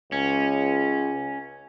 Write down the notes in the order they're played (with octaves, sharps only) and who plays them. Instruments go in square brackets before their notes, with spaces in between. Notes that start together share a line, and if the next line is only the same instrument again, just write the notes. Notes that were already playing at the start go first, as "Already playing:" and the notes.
[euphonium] C#2 [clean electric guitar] C#4